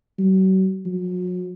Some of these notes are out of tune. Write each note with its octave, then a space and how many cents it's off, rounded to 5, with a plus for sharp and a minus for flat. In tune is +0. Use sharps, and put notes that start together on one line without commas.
F#3 +40
F#3 -40